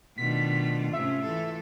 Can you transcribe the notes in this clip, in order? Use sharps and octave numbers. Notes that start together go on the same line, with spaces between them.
B2 D#3 A3 D4 F4 B6
G#2 C3 C#4 E5
E3 A4